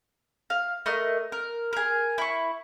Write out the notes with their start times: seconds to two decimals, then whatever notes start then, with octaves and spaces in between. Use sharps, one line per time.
0.50 F5
0.86 A3 A#4 D#5
1.32 A#4
1.73 G#4 A#4
2.18 E4 C#6